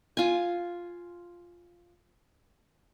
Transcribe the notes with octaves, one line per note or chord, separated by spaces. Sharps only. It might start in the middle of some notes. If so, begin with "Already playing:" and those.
F4 G#5